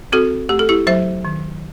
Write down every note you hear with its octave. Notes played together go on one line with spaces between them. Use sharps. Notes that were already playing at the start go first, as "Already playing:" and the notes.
C4 F#4 A4
A3 G4
A4
E4 G4
F#3 C5 E5
D#3